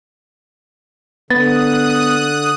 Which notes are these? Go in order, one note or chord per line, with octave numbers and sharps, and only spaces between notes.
D3 B3 D#6 F#6 A6